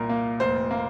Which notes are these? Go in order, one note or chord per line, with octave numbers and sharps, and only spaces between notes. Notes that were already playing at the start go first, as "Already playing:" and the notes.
Already playing: C2 A#2 A#4
A#3
F1 C5
A#3